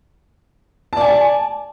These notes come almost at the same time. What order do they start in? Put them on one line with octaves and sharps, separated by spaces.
A5 D5 G#5